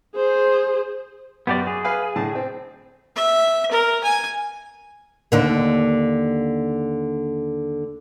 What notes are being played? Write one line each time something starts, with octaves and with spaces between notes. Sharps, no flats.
G#4 C5
F#2 B3 G4 D5
G#4
B4 F5 G#5
A2 D3 A5
C4
E5
A#4
G#5
D#2 D3 A#3